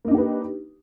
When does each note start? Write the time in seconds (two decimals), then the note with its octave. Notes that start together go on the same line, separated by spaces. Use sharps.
0.05 A#3
0.08 D#4
0.11 D4
0.15 G4
0.18 B4